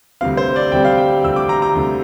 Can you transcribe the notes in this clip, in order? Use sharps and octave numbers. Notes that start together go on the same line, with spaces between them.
D2 C3 G3 C4 F5
C5
D5
D2 C3 G3 C4 G5
F5
G5
D2 C3 G3 C4 E6
D6
A#5
A#5
D2 C3 G3 C4